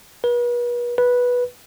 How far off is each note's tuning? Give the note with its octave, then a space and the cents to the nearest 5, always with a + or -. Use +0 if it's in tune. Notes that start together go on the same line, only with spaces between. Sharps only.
B4 -40
B4 -10